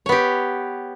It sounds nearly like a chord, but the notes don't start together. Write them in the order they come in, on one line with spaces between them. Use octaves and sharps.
C#5 B3 G4